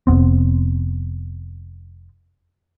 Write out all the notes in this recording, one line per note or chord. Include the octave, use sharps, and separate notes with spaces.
F1 G2 B3 C4